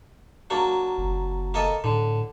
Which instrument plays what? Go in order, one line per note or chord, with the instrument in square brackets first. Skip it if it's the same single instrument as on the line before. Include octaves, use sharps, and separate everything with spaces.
[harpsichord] F#3 A#3 D4
[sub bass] F#1
[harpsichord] A#3 A4 D#5
[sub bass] A2 [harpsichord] D3